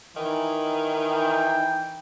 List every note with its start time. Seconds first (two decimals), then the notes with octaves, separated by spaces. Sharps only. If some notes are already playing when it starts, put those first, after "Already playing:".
0.16 D#3 E3 D#4
1.10 G5